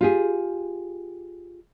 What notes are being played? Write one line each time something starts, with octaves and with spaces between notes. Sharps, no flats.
F4 G4 G#4